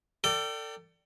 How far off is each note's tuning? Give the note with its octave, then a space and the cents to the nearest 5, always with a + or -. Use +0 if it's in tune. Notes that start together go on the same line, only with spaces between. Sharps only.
A4 +35 D5 +0 G5 -20